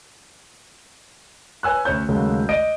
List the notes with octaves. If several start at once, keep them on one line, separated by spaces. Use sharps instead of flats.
B4 C#5 G#5 E6 F#6
D2 C#4 C#5 G6
D#2 C#3 F#3 G#3 A3
D5 D#5 D7